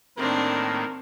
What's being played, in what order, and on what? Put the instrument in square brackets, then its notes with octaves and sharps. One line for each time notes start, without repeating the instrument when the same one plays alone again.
[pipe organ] A2 D#3 A#3 [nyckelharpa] C4 D4 [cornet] A#4